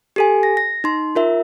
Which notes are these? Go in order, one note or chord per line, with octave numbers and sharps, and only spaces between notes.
G4 A4 G#5
A#6
A#6
D#4 C6
F4 A#4 E5